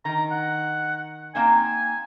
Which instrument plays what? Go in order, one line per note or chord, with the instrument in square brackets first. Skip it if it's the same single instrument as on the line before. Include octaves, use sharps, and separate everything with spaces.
[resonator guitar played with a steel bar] D#3 D#4 [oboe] A#5
[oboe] F#5
[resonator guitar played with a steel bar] A#3 C4 D#4 [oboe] G#5